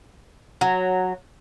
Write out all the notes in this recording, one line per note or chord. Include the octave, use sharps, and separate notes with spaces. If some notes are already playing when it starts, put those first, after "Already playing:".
F#3